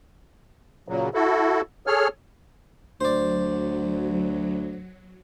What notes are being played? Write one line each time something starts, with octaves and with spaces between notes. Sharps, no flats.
A#2 C#3 F#3
E4 F#4 A4
G#4 A4 C#5 F6
D2 F#3 C5 D5